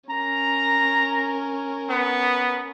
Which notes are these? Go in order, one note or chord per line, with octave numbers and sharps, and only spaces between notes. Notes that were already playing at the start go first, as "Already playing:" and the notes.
C#4 A#4 A#5
B3